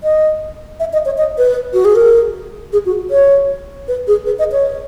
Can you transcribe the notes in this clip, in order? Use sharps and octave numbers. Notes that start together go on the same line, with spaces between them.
D#5
E5
D#5
C#5
D#5
B4
F#4
G#4
A#4
G#4
F#4
C#5
B4
G#4
B4
D#5
C#5